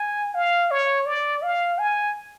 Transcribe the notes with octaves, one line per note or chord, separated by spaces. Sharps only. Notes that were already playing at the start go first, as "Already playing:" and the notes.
Already playing: G#5
F5
C#5
D5
F5
G#5